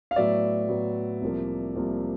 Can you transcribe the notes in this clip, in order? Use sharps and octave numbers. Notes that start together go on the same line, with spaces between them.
F5
A2 F#3 B3 D5 E5
A2 F#3 B3
C2 C3 F3 A#3
C2 C3 F3 A#3